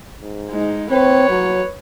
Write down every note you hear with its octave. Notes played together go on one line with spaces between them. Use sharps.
G#2
G#3 D#4
C4 B4 C#5
F#3